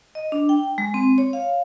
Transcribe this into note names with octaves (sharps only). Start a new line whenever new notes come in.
D#5
D4
G5
G#3
C4
C#5
F5